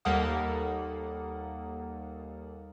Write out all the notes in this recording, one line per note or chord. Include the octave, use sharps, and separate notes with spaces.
D#2 G3 A#3 A4 F#5 D#6